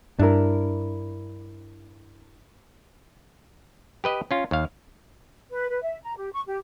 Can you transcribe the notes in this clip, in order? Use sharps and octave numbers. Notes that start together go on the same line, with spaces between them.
G2 D4 E4 A#4
G4 B4 D#5
C#4 F4
D#2 F5
B4
B4
E5
A#5
G4
C#6
G4